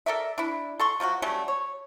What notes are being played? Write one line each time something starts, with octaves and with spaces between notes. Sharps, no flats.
A4 A#4 D5 E5
D4 E4
A4 C6 C#6
F3 F#3 D#4 F#4
F#3 G3 A3 C#4
C#5